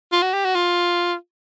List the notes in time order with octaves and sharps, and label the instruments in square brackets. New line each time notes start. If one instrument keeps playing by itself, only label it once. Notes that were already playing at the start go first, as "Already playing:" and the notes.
[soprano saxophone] F4
F#4
G4
F#4
F4